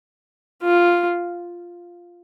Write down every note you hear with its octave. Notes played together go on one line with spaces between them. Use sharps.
F4